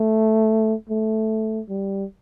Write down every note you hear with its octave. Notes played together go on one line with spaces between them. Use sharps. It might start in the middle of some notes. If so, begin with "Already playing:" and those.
Already playing: A3
A3
G3